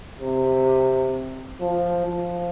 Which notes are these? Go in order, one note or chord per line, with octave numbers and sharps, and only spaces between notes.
C3
F3
F3